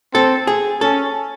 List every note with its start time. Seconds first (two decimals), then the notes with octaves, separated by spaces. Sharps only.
0.14 C4 A4
0.47 G#4
0.81 C#4 A4